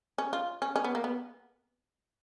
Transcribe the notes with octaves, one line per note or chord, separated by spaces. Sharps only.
C#4
F4
C#4
C#4
B3
A#3
B3